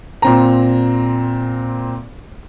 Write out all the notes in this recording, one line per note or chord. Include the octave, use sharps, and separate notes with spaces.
A#2 C4 A#5